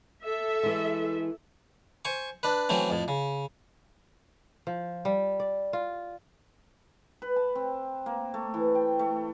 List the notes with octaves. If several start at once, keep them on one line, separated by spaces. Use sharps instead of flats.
A4 E5
E3 G#3
C5 G#5 C#6
D4 B4
E3 F#3 A3 C4 C#4
F2 A2
C#3
F3
G3
D5
F4
B4
A5
C4
A#3
A3
E3
G5
A3